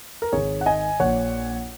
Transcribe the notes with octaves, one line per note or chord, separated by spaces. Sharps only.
A#4
G#1 G#2 D#3 G#4 C#5
F#5
D#5 G#5
A#1 A#2 C#5 F#5